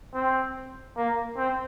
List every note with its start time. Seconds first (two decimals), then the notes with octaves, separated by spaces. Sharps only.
0.14 C4
0.96 A#3
1.37 C4